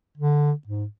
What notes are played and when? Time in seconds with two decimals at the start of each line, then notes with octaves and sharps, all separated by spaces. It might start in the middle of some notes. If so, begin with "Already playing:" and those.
0.17 D3
0.67 G#2